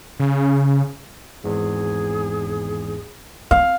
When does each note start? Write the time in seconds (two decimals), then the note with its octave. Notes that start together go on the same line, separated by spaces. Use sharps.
0.20 C#3
1.44 G#1 E2 G#2 G#4
3.51 C4 F5